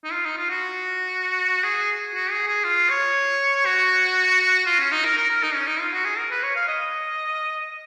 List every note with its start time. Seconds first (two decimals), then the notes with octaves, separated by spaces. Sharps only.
0.04 D#4
0.12 F4
0.25 D#4
0.37 F4
0.50 F#4
1.64 G#4
2.15 F#4
2.31 G#4
2.48 G#4
2.64 F4
2.90 C#5
3.66 F#4
4.66 F4
4.79 C#4
4.92 D#4
5.04 A#4
5.17 A#4
5.30 A#4
5.43 D#4
5.55 C#4
5.67 D#4
5.80 F4
5.93 F#4
6.05 G#4
6.18 A#4
6.31 B4
6.43 C#5
6.56 F5
6.68 D#5